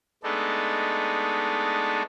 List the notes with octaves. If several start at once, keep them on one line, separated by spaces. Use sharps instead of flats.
G#3 A3 B3 D4 D#4 A4